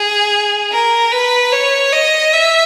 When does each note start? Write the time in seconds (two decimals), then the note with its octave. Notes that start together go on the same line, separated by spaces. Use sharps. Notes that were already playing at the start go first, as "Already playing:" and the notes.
Already playing: G#4
0.72 A#4
1.12 B4
1.52 C#5
1.93 D#5
2.33 E5